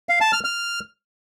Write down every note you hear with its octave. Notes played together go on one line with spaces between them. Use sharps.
F5
A5
F6
F6